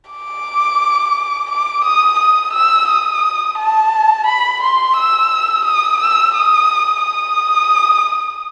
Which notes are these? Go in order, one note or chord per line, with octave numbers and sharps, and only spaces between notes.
D6
D6
D#6
D#6
E6
D#6
A5
B5
C6
E6
D#6
E6
D#6
D#6